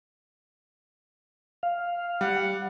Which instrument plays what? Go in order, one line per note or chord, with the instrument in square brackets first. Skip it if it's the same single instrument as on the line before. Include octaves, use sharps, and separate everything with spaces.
[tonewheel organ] F5
[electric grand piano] G3 [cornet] F#5